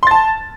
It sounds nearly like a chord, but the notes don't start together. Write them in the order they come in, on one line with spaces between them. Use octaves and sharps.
C6 A6 A5